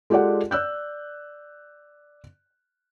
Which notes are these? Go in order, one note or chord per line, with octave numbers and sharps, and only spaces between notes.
G#3 F4 G4 A4 D5 F#5
D5 E6 F#6 G6